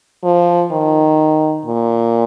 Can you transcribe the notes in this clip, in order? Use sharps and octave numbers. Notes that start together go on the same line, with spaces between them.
F3
D#3
A#2